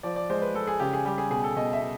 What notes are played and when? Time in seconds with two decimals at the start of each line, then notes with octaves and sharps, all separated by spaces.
0.03 F3 D5
0.16 D5
0.30 G#3 C5
0.42 B4
0.54 G#3 A4
0.67 G#4
0.79 C#3 G4
0.93 G#4
1.05 G3 G4
1.18 G#4
1.30 B2 G#4
1.44 A4
1.56 B2 D#5
1.73 E5
1.82 B2